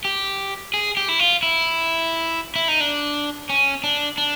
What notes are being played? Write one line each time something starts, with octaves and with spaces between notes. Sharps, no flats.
G4
G#4
G4
E4
F4
E4
E4
D#4
D4
C#4
D4
D4